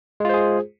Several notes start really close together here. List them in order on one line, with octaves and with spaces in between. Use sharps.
G#3 F4 C5 G#4